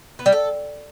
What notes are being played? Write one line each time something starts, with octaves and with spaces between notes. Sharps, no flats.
B3
G3
A4